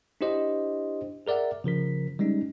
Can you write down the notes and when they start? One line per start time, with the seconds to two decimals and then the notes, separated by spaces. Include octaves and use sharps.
0.21 D4 E4 G4 C5 D#5
1.27 G#4 A#4 D5 E5 F#5
1.64 C#3 F3 A#4 B6
2.19 G3 G#3 C#4 D#4